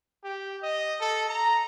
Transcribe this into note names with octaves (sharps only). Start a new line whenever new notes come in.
G4
D#5
A4
A#5